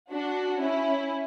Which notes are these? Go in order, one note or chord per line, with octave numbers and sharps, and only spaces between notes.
D4 F#4
C#4 E4